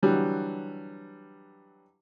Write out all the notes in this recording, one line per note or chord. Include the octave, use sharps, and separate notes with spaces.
D3 E3 F#3 G3